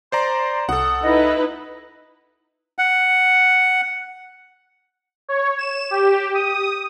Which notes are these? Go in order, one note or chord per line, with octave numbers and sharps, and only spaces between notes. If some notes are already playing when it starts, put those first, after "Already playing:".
C5 D5 A#5 C6
C2 A4 F#5 D#6
D#4 E4 B4 D#5
F#5
C#5
E7
G4
D#6